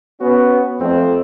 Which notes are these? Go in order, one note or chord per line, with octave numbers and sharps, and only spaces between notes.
B3 C#4 F#4
F2 A3 C4